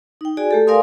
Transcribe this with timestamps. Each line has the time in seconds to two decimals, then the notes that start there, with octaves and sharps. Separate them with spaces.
0.21 D#4 G5
0.37 F#4 G#4 D5 G#5
0.51 A3 G4 A4
0.67 A#4 D5 F5 G#5 C6 D#6